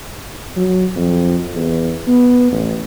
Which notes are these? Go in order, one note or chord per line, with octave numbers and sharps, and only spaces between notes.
F#3
F2
E2
B3
A1